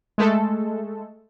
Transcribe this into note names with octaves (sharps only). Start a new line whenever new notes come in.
G#3 A3 A4